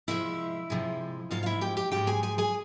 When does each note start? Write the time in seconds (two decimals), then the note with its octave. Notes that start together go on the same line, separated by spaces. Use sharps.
0.08 C3 F3 G#3 E4 E5
0.70 C3 F3 G#3
1.31 G#2 F3 G#3 F4 F5
1.43 F5
1.46 E4 E5
1.61 G4 G5
1.77 G4 G5
1.92 G#2 F3 G#3 G4 G5
2.07 G#4 G#5
2.23 G#4 G#5
2.38 G#4 G#5